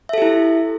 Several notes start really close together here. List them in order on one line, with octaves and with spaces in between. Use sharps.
E5 A4 G4 E4